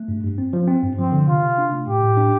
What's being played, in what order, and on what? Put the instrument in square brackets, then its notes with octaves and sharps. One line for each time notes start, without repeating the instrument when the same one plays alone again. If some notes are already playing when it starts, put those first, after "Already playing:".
Already playing: [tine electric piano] A3
G2
G2
C4
F3
C4
G2
[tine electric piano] F3 [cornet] C4
[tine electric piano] D3
[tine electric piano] C3 [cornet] F4
[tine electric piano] C3
D4
A3
[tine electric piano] A2 [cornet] G4
[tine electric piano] A2
D4